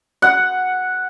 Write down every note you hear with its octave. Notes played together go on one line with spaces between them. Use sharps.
F#5